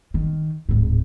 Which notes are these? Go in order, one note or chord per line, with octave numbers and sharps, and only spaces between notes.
D#3
D1 G#2